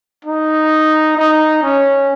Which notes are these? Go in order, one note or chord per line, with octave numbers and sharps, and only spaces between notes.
D#4
D#4
C#4